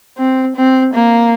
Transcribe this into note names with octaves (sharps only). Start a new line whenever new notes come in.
C4
C4
A#3